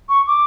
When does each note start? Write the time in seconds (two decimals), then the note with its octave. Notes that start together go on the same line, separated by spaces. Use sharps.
0.09 C#6
0.27 D6